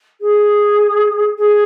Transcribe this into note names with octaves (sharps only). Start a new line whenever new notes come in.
G#4
G#4